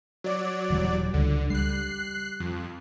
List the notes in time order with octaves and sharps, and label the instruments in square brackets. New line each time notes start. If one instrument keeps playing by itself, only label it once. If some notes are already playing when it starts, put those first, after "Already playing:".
[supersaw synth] F#3 D5
[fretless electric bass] D#1 E3 G3
[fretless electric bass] C#2 [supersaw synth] D3
[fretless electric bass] G3 [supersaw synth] F#6 C7
[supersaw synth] F2